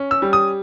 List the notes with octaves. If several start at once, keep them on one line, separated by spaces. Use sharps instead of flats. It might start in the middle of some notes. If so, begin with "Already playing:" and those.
Already playing: C#4
E6
G3
D#6